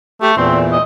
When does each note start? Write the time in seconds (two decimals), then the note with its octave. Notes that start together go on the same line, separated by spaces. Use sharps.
0.22 A3 G4
0.37 E2 A#2 E3 C4
0.72 D#5